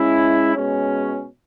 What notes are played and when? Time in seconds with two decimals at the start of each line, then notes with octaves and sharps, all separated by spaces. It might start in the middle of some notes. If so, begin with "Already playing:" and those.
Already playing: G#3 C#4 E4
0.55 B2 G#3 C#4